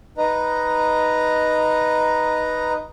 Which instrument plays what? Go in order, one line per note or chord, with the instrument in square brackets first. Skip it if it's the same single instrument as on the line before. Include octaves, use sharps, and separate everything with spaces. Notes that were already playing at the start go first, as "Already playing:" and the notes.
[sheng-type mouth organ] D#4 B4 D#5 A#5